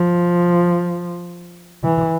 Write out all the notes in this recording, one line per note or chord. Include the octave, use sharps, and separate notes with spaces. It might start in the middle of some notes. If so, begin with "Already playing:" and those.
Already playing: F3
E3